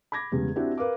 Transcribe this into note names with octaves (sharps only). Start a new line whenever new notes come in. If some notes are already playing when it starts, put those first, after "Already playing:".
B5 D6 G#6 A#6
E2 C#3 G3 G#3
C4 D4 E4 F#4 G4
A#4 B4 F5 D6